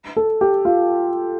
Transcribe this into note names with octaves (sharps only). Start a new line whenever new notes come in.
A4
G4
F4